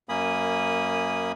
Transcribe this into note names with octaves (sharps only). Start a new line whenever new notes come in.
F#2 A#3 G#5 B5 D#6